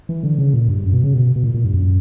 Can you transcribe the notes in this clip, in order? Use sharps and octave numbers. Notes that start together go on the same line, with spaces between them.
E3
D3
C#3
A#2
G2
F#2
B2
C#3
B2
B2
A#2
A#2
G2
F#2